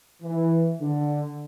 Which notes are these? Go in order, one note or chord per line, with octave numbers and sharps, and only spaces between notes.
E3
D3